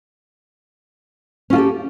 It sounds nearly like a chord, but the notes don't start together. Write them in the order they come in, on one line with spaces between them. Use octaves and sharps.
C#4 F4 A4 G4